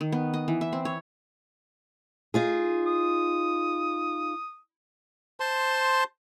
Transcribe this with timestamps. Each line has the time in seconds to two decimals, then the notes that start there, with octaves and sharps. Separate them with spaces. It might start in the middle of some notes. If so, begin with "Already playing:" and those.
0.01 D#3
0.12 B3
0.34 D#5
0.48 E3
0.61 E5
0.73 C4
0.85 C#5
2.34 D#4 F4 G#4
2.86 D#6
5.40 C5 A5 C6